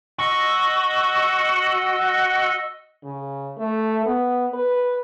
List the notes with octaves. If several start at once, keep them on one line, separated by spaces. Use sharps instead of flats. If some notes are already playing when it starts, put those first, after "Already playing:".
F#4 D#5 E6
C#3
A3
B3
B4